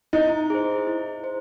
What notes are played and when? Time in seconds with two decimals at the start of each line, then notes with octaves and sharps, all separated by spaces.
0.13 D#4 E4
0.50 G#4 C5
0.87 E4
1.24 C5